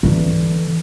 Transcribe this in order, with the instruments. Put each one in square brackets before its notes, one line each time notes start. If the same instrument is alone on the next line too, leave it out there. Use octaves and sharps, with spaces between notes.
[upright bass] D3 E3